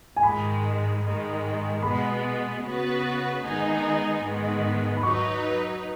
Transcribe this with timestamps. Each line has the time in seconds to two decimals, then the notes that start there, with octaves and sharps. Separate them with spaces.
0.17 G#5
0.23 G#2 D#3 G#3 B5
1.03 G#2 D#3 G#3
1.82 B2 G#3 B3 B5
2.63 C#3 B3 F#4 B4
3.43 D#3 G#3 B3 D#4 G#4
4.23 G#2 D#3 G#3 B3
4.97 B5
5.03 F#3 D#4 B4 C#6